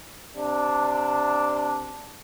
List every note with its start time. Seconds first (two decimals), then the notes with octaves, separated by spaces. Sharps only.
0.35 C3 D4